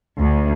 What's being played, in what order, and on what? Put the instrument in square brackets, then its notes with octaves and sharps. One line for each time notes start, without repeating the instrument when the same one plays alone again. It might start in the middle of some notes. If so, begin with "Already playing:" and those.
[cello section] D2